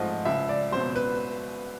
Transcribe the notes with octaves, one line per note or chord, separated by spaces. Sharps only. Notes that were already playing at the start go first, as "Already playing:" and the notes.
Already playing: G#2 F3 A3 D#5
C#2 E5
D5
B2 F#3 C5
B4